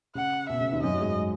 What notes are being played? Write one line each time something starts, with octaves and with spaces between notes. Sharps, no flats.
C#3 F#5
B2 E5
C#3
D#2 D#3
F#2 F#3 D#5
F#3
G#2 G#3
G#3